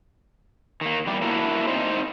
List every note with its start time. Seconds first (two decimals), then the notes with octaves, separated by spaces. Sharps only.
0.81 D#3 A#3
1.06 E2 G3 D5
1.21 A3 A#3 D4 E4 F#4 A#4
1.67 C4 D#4 C5